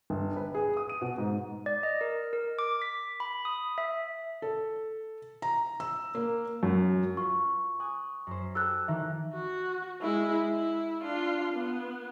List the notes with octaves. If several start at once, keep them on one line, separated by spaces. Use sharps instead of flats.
G1
B4
G#4
D#6
D#7
B2
G#2
D5
D#5
A#4
A#4
D6
B6
B5
D#6
E5
A4
A#5
E6
A#3
F#2
F4 B4 C#6
G#5 D#6 F#6
F#2 C5
G4 A4 A5 E6 F#6
D#3 E3 E5
F#4
G#3 E4
E4
D4 F4
B3